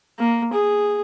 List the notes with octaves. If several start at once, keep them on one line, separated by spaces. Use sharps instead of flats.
A#3
G#4